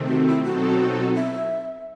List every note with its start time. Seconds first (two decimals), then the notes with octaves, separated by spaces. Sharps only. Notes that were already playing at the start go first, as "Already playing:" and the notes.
Already playing: C3 D#3 A3 C4
0.08 F#4
0.27 E4
0.44 B2 F#3 C4 D#4 F#4 A4
1.15 E5